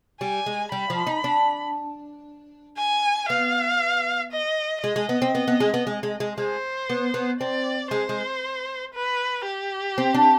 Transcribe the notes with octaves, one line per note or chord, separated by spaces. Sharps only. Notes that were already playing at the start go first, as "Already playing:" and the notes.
G3 G#5
G#3
G3 B5
F3
D#4
D4
G#5
B3 F5
D#5
G#3 D#5
G#3
B3
C4
B3
B3
G#3
B3
G#3
G#3
G#3
G#3 C5
B3
B3
C4 D5
G#3 C5
G#3
B4
G4
C4
D4